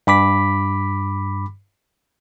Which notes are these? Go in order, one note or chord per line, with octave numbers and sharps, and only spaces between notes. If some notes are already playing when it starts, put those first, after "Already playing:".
G2 B5 D6 B6